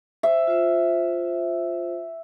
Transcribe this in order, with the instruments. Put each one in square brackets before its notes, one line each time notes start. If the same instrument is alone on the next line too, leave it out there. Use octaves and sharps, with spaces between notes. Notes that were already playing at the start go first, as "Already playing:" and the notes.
[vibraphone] C5 [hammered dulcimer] E5
[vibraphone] F4 C5